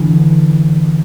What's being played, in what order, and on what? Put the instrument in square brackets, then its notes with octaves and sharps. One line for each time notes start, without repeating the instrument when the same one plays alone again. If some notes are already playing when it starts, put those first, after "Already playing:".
Already playing: [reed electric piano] D3 E3